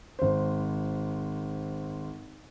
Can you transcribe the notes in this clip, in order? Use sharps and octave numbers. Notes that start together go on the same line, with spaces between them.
G#1 C5